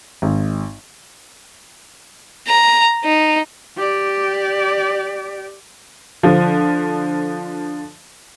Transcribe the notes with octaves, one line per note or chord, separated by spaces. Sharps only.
G#1
A#5
D#4
G4 D5
D3 F3